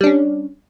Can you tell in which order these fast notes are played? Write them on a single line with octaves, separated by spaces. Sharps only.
G3 D4 C#4